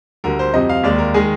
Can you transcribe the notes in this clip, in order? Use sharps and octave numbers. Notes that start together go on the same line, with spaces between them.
D2 D3 G3 A#4
C5
F2 C3 G3 D#5
F5
D#2 D#3 G#3 D5
A#4
D#3 G#3 G#4